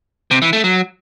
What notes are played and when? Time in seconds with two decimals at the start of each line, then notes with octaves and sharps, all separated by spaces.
0.31 C3
0.42 E3
0.53 A3
0.64 F#3